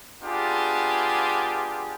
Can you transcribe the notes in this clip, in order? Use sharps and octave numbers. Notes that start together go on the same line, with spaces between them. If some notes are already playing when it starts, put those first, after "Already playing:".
B3 D4 F4 G4 G#4